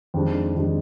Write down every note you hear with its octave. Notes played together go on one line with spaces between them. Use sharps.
F2 D#3 G#3 D4 C5
F2 D#3 G#3 D4